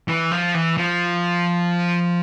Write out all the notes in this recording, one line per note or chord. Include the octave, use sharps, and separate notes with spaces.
E3
F3
E3
F3